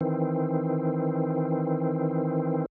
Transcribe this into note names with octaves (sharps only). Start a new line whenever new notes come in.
D#3 E3 C4